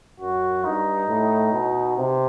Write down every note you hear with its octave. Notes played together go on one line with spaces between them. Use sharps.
F#2 F#4
G2 D#4
A2
B2
C3